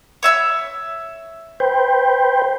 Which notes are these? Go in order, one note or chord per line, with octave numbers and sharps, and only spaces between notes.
C#5 E5 E6
B4 C5 G5